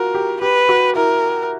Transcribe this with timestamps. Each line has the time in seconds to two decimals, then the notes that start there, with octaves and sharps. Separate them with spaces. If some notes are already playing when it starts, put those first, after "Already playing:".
Already playing: F4 F#4 A#4
0.15 G4
0.41 G4 B4
0.69 F#4
0.96 E4 A#4